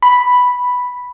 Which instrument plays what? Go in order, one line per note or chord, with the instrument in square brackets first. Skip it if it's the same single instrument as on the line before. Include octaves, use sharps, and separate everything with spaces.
[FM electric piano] B5